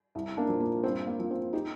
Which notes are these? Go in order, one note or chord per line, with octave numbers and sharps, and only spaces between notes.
C2
A#3 D4
A#2 F3
A#3
G2 C4
A#3
F3
C4
D#4 G4